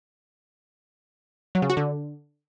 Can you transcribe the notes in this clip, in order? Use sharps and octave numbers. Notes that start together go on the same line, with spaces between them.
F#3
C#3
F#4
D3